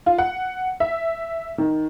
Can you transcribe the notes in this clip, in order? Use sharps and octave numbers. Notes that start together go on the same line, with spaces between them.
F4
F#5
E5
D#3